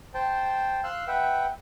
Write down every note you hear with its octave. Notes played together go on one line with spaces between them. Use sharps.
C5 G5 A5
F5 C6 E6 F#6
B4 E5 F#5 G5